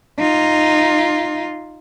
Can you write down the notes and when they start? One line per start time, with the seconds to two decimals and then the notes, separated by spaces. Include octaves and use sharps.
0.19 D#4 F4